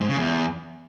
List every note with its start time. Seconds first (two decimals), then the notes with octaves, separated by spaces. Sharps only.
0.01 G#2
0.09 C#3
0.17 E2